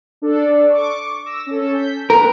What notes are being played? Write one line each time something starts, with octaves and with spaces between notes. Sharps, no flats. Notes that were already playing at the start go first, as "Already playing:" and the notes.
D4 A4 D5
C#6 D6
E6 A#6 E7
C#4 A4
G6 B6
A#4 B4 G5